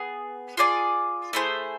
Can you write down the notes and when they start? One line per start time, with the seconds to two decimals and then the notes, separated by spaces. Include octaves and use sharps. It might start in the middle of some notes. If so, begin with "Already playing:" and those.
Already playing: B3 G#4
0.57 F4 G#4 D5 G#5
1.33 A3 E4 G#4 C5